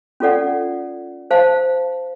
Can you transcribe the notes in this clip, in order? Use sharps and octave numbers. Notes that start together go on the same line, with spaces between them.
C#4 F4 A4 D5 F#5
C5 F5 A5